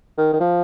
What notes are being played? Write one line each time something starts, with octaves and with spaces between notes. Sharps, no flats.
D#3
D#3
F3